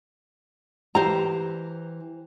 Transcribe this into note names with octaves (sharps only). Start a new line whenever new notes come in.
E3 G4 C5 A#5